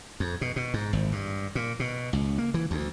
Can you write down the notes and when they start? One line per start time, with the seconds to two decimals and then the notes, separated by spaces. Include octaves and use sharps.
0.20 F2
0.41 B2
0.56 B2
0.74 G#2
0.93 G#1
1.12 G2
1.55 A#2
1.80 B2
2.13 C#2
2.38 A#3
2.54 E3
2.71 D2